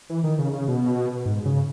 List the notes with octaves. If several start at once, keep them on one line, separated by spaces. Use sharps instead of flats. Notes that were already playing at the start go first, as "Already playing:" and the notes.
E3
D#3
C#3
C#3
B2
G#2
C#3